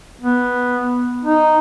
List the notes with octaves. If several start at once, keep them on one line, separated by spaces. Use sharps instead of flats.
B3
D#4